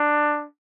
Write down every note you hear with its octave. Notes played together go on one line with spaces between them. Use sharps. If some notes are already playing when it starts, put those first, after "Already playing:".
Already playing: D4